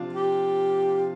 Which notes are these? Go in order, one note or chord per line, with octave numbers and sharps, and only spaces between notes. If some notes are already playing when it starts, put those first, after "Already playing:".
Already playing: C3 F3 D4 F4
G4